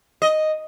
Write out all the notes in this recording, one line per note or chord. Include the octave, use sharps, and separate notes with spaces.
D#5